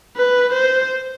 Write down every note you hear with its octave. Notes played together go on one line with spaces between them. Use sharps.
B4
C5